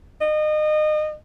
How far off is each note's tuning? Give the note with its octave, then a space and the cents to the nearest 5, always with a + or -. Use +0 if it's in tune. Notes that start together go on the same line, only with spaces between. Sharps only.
D#5 -30